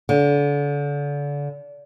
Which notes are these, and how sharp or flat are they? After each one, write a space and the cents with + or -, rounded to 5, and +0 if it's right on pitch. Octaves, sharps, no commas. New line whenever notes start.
D3 -30